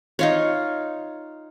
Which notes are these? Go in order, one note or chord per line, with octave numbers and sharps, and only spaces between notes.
D#4 F4 C#5